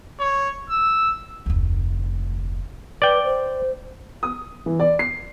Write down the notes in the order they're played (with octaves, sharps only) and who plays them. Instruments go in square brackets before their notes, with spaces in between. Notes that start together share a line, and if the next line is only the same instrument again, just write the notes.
[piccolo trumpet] C#5
E6
[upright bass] F1 D2
[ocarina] B4 [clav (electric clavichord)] D5 G5
[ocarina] C5
[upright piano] D#6
E3
D5
C7